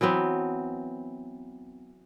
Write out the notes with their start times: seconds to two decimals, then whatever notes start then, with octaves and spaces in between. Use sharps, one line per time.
0.01 E3 F#3 B3 C4